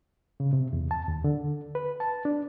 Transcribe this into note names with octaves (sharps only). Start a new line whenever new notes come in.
C#3
C3
E2
A5
D#2
D3
B4
A5
D4